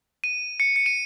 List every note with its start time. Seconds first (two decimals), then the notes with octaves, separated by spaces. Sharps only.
0.24 D#7
0.60 C#7
0.76 C#7
0.86 D#7